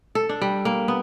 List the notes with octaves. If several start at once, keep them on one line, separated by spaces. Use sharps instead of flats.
A4
D4
G3
A#3
B3